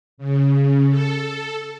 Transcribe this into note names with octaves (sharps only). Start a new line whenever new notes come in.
C#3
A4